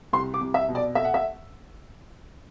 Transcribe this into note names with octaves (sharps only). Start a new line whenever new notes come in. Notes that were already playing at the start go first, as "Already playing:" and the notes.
C2 C6
D6
C2
E5
B2
D5
A3 E5
F#5
E5